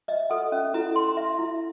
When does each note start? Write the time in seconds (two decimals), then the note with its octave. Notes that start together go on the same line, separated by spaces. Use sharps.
0.08 D#5 E5
0.30 A4 F#5
0.52 C#4 E5
0.74 E4 A4
0.96 C6
1.17 E5
1.39 E4